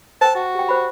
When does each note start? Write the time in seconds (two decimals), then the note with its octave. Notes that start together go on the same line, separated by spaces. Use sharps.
0.21 C5 G5 A5
0.35 F#4
0.55 G4 G5
0.68 C5 F#5 B5